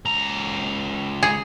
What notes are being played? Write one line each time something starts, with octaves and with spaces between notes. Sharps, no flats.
C#2 A#5
G#4